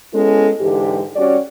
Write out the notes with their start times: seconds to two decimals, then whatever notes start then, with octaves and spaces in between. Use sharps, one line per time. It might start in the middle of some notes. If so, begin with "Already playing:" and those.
0.13 G#3 B3 C#4 E4 A4
0.61 G#2 D3 E3 G4
1.16 G3 C#4 F#4 G4 C#5 D5